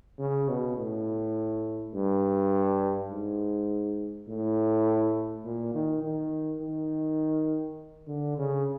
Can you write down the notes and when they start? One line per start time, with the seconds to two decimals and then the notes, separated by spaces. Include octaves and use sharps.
0.19 C#3
0.48 B2
0.77 A2
1.94 G2
3.11 G#2
4.29 A2
5.45 A#2
5.74 D#3
6.03 D#3
6.61 D#3
8.08 D3
8.38 C#3